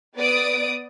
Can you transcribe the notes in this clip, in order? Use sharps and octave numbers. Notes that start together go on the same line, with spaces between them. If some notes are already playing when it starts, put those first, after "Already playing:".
B3 D5 D#6 D7